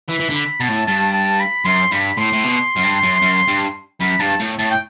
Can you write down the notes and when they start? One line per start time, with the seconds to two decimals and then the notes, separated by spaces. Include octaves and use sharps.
0.09 E3 B5
0.20 E3
0.30 D3
0.35 B5
0.60 B2 A5
0.69 A2
0.87 G2 A5
1.14 A5
1.40 B5
1.65 F#2 C6
1.92 G2 B5
2.17 A2 C6
2.33 A2
2.44 B2
2.76 F#2
2.83 G2
3.03 F#2
3.22 F#2
3.48 G2
4.00 F#2 B5
4.20 G2 A5
4.40 A2
4.59 A2 A5
4.71 G5